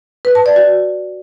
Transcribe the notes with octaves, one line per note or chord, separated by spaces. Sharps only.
B4
A5
D5
F#4